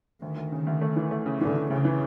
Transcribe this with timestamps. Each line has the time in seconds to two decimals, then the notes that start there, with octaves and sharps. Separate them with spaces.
0.22 D2 D#3
0.37 D2
0.52 C#3
0.67 D2
0.81 A3
0.96 E3
1.11 A3
1.26 C#3
1.40 D3 E3
1.56 C#3
1.70 D2 C#3
1.85 E3